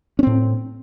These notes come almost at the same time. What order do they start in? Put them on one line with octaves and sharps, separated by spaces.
C#4 C4 A2